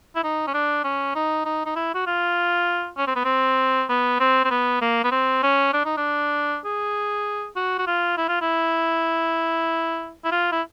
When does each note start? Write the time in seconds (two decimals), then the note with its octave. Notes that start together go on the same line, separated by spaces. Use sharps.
0.16 E4
0.24 D#4
0.47 C#4
0.54 D4
0.84 C#4
1.16 D#4
1.46 D#4
1.66 D#4
1.76 E4
1.95 F#4
2.07 F4
2.98 C#4
3.07 C4
3.16 B3
3.25 C4
3.89 B3
4.20 C4
4.45 C4
4.51 B3
4.82 A#3
5.04 B3
5.12 C4
5.43 C#4
5.73 D4
5.85 D#4
5.98 D4
6.65 G#4
7.56 F#4
7.79 F#4
7.87 F4
8.18 E4
8.29 F4
8.42 E4
10.25 E4
10.32 F4
10.52 E4